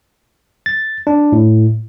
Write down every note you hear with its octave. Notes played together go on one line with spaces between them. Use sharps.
A6
D4
A2